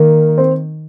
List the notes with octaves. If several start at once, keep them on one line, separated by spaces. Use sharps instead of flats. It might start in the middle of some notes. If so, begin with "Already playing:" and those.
Already playing: D#3 A#3
C4